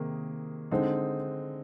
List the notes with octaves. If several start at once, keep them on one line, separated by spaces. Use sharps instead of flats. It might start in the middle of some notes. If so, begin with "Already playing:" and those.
Already playing: C3 D#3 A#3 G#4
D3 G#3 C4 D#4